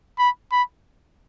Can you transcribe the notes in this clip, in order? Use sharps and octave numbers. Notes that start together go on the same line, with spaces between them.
B5
B5